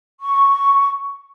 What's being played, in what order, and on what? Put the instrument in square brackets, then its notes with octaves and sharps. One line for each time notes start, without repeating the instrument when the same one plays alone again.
[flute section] C#6